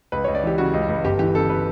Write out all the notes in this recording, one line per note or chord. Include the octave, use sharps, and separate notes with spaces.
C#2 B4
C#2 C#5
D5
E3 G4
C#3 F#4
C#2
C#2
G1 G4
E3 G4
C#3 A4
B4